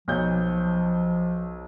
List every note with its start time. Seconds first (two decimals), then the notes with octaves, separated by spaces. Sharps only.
0.08 B1 F3 C#5 G6